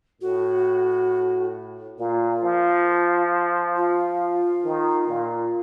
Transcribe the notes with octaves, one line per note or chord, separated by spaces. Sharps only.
A2 F#4
A#2 F4
F3
F4
D#3
A#2